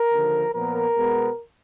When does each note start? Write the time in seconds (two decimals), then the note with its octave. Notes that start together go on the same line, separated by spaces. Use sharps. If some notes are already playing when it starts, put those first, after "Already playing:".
Already playing: A#4
0.12 D#2 D3 F3
0.54 A#2 F3 B3 A#4
0.95 B2 G#3 B3